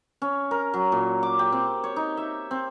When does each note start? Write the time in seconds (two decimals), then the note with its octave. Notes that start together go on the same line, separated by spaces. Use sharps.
0.22 C#4
0.51 A#4
0.74 F#3
0.92 A#2
1.23 D6
1.39 G4
1.52 C4
1.84 C#5
1.96 D#4
2.17 E5
2.51 C4